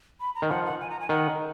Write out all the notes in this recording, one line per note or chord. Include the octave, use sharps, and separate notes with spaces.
B5
A#5
D#3
F3 F#5
F#5
G#5
A#5
G#5
D#3 F#5